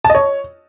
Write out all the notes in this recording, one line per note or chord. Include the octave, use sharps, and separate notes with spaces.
A5
D#5
C#5